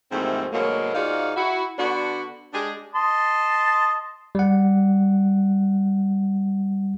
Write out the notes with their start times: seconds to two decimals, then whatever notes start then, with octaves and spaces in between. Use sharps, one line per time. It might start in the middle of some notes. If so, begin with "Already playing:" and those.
0.12 D#2 G#2 E3 F3 A3 C4
0.53 D2 B2 F#3 G#3 A#3
0.95 G#2 D#4 F4 F#4 D5 F5
1.37 E4 F#4
1.78 D3 B3 D4 F#4
2.53 G#3 D4 G4 G#4
2.95 D#5 A5 C6
4.35 G3 F#5